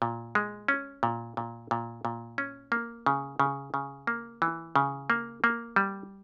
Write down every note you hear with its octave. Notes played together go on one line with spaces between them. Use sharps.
A#2
G#3
C#4
A#2
A#2
A#2
A#2
C#4
A#3
C#3
C#3
C#3
A#3
E3
C#3
A#3
A#3
G3